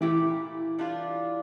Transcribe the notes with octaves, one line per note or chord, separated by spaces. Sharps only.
A#2 E3 A3 E4 G4
G3 D4 F4